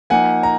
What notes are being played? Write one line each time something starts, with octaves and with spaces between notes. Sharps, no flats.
F3 A#3 D#4 F#5 G#5
A#5